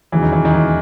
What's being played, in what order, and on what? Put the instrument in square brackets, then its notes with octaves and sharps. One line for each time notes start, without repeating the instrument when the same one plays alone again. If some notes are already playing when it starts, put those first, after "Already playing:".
[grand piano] E1 D#2 C#3 F#3 [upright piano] E3
[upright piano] D#3
E3
D#3
E3